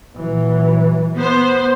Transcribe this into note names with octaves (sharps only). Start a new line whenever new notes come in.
A#2 E3 F#3
B3 C5